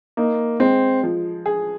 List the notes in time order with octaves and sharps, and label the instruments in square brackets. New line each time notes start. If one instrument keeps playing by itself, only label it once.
[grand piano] A#3 [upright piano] D#4
[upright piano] G#3 [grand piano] C4
[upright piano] F3
G#4